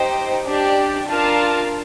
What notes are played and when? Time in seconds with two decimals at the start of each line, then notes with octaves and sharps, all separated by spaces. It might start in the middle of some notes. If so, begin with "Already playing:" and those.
Already playing: D#4 G4 C5 G5
0.49 D4 G4 D5
1.09 D4 F4 A#4 F5 A5